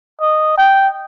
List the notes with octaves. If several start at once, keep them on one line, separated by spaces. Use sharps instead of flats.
D#5
G5